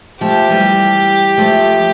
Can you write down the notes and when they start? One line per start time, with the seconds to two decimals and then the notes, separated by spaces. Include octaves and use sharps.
0.21 F3 A3 G4
0.50 E3 G3
1.37 F3 A3